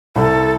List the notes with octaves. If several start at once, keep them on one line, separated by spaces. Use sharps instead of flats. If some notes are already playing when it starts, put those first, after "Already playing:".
C2 A4